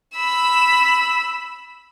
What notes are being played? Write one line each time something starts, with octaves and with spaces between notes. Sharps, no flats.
B5 E6